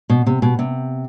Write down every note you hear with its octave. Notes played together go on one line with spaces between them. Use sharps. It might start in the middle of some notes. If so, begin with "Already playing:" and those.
B2
C3
B2
C3